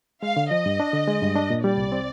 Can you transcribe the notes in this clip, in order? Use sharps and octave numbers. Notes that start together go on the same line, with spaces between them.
G#3 F5
D3
F3 D#5
G2
D4
D3
G#3
G2
D4
A#2
G3 D5
C2
C4